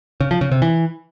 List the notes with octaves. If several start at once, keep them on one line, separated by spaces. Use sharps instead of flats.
C#3
F3
C#3
C3
E3